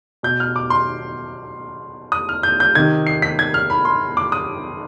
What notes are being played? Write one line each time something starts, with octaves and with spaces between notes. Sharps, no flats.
B2 G6
F6
D6
C6
D#6
F6
G6
G6
C3 D#3 G#6
C7
B6
G#6
F6
B5
C6
D6
D#6